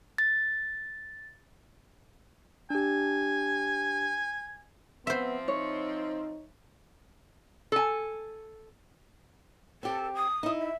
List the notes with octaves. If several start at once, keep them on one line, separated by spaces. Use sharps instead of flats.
A6
D4 G4 G#5
F3 B3 C4 C5 E5
D#4 C#5
A4 G#5
C4 G4 A4
D#6
D#4 E4
E5